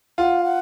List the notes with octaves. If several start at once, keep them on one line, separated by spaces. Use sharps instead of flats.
F4 F#5
F5
F#5